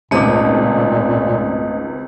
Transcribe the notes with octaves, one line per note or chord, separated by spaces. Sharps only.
G#1 C#2 A#2 A3 D#5 D6 D#6